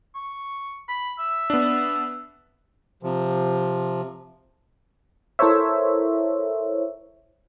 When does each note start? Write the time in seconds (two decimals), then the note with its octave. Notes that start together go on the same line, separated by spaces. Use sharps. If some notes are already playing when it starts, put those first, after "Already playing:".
0.15 C#6
0.89 B5
1.19 E5
1.50 B3 D4
3.03 C3 F3
5.39 E4 A4 A#4 C5 C#5 E5